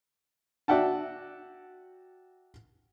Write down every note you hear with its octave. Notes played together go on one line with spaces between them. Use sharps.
F#4 D5 E5 F#5 G5 A5